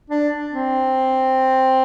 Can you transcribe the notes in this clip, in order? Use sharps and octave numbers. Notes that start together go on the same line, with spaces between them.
D4
C4